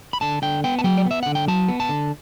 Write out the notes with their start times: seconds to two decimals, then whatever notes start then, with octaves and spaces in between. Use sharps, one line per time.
0.13 B5
0.21 D3 A5
0.42 D3 G5
0.64 B3 G5
0.79 A5
0.84 F#3 G5
0.98 D5
1.05 B3
1.11 E5
1.23 D3 F#5
1.35 G5
1.48 F#3 A5
1.69 B3
1.80 A5
1.89 D3